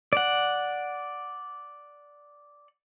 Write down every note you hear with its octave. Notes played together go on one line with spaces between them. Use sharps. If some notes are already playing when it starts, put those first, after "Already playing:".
D5 F#5